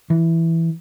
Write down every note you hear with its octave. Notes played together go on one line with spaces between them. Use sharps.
E3